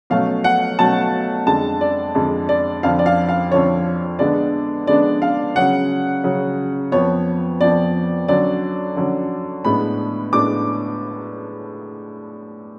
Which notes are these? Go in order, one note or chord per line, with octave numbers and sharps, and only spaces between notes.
B2 F#3 A3 C#4 F5
F#5
B2 F#3 A3 C#4 A5
F2 D3 G#3 A5
D5
F2 D3 G#3
D5
F2 D3 F3 F5
D5
F5
F5
F2 D3 F3 C#5
D3 G#3 B3 D4 D5
D3 G#3 B3 D4 D5
F5
C#3 F#3 C#4 F#5
C#3 F#3 C#4
F2 F3 B3 C#5
F2 F3 B3 D5
D3 F#3 C#4 D5
D3 F#3 C#4
A2 G#3 B3 D4 B5
A2 G#3 B3 D4 D6